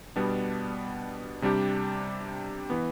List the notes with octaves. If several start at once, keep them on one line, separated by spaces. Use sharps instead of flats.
B2 G3 B3 D4
C3 G3 D4 G4
E3 B3